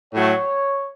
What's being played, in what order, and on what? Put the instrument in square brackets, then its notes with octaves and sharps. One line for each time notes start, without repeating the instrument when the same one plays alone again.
[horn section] A2 F#3 A3 [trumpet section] C#5